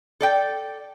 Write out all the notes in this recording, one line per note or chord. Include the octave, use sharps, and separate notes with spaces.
A4 D5 G5